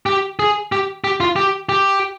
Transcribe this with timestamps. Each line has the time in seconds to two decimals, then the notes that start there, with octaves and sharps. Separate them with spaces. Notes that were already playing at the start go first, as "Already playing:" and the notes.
0.06 G4
0.39 G#4
0.72 G4
1.04 G4
1.20 F4
1.36 G4
1.69 G4